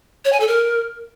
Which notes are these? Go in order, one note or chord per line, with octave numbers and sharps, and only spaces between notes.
C#5
G#5
A4
A#4